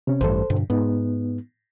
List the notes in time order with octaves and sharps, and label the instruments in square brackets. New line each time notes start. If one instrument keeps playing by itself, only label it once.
[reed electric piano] C3 C#4
[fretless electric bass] A1 G2 E3 [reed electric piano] A4 C5
[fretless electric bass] G2 B2 D3
[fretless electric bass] G#2 [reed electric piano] B3 D#4